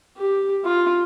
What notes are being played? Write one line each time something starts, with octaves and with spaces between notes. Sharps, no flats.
G4
F4